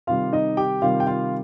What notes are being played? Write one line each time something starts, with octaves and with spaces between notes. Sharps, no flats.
C3 D#3 G3 F4 F5
D#4 D#5
G4 G5
C3 D#3 G3 F4 F5
G5
F4 F5